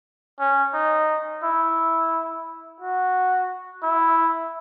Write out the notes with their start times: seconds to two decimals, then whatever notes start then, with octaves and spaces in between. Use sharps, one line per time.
0.40 C#4
0.74 D#4
1.43 E4
2.80 F#4
3.83 E4